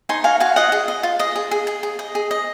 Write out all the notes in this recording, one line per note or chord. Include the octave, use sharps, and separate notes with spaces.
D#4 G#5 C6
F#4 F5 G#5
F#4 F5 G#5
F4 D#5 F#5
G#4
D#5
F4
G#4 D#5
G#4
G#4
G#4
G#4
D#5
G#4
D#5